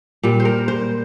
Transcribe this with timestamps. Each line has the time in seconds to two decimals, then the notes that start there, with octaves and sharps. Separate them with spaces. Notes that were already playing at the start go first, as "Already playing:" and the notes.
0.23 A#2 G3
0.40 C5
0.45 A#4
0.68 C5